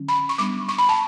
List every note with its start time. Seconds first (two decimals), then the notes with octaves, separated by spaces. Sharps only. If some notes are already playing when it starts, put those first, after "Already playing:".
Already playing: D3 F#3 C#4
0.08 B5
0.29 C#6
0.38 G3 B3 D4 D6
0.68 C#6
0.78 B5
0.89 A5